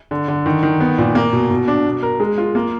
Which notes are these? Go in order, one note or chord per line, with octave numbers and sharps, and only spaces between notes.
D3
D3
D#3
D#3
B3
A#2
A#3
B2
B2
D4
B2
A#4
G#3
F4
A#3